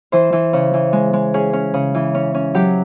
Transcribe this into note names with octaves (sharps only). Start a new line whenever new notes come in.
E3 C5
E3
C#3
E3
G#3
G#3
C#4 G#4
C#4
C#3
E3
C#4
C#4
F#3 G4